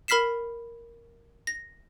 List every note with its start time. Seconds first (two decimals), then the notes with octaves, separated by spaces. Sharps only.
0.08 A#4 B5 F6 B6 C7 E7
1.47 A#6